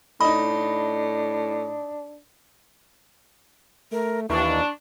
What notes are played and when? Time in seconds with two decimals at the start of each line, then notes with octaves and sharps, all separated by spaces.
0.21 A2 D4 D#4 D#5 B5
3.92 A3 A#4
4.30 D#2 E3 D4 C#6